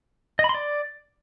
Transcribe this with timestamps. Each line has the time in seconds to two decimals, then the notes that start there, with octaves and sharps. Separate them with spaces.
0.39 D#5
0.44 B5
0.49 C6
0.54 D5